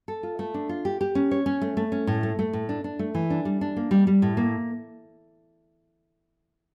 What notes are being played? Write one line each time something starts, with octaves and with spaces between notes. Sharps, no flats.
A4
F4
A3
D4
F4
G4
G4
C#4
C#5
C#4
A3
A3
C#4
A2
A3
A3
A2
D4
D4
A3
E3
D4
G3
D4
A#3
G3
G3
A2
A#3